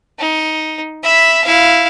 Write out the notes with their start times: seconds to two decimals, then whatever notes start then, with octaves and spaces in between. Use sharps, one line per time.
0.19 D#4
1.03 E5 B5
1.44 E4 F5